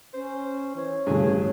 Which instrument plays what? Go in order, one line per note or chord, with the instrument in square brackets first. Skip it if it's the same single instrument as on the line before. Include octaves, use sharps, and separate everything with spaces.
[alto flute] C#4 [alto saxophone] C5
[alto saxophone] E3 [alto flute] C#5
[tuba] A1 [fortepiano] G2 C#3 [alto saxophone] G#4